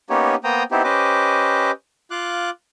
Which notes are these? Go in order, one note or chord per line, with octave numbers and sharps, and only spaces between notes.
A#3 B3 C#4 D#4 G4 C#5
A#3 B3 C5 G5 A#5 D#6
B3 C4 D#4 E4 G4 C5
C#4 G4 B4 C5 D#5 D6
F4 F5 D6 F#6